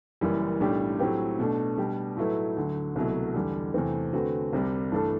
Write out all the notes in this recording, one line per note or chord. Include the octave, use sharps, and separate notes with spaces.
F#1 F#2 E3 G3
B1 A2 G3 D4 G4
A2 F#3 C4 G4
B2 A3 D4
B2 G3 D4 G4
A2 F#3 A3 E4 B4
D2 D3 F#3
C2 B2 F#3 A3 E4
E2 D3 G3
E2 C3 E3 A3 C4
D3 A3 C4 F#4 B4
C2 C3 G3
G2 E3 A3 D4 A4